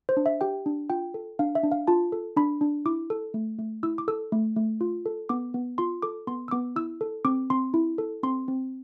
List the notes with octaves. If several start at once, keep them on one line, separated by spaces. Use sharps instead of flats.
C5
D4
E5
G4 G5
D4
F4 G5
A4
D4 F5
E5
D4
F5
F4 A5
A4
D4 B5
D4
E4 D6
A4
A3
A3
E4 E6
D6
A4 E6
A3
A3
F4
A4
B3 D6
B3
F4 C6
A4 D6
B3 C6
E6
B3 D6
E4 E6
A4
C4 D6
C4 C6
E4
A4
C4 C6
C4